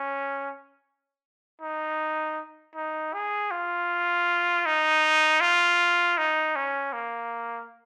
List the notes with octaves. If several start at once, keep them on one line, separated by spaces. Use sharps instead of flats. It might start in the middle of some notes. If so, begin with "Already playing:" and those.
Already playing: C#4
D#4
D#4
G#4
F4
D#4
F4
D#4
C#4
A#3